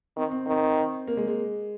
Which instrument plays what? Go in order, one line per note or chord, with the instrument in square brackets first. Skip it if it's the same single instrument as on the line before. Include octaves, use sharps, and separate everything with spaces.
[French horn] D#3 [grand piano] C4
[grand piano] C4
[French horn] D#3 [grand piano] C4
[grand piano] A#3
G#3
G#3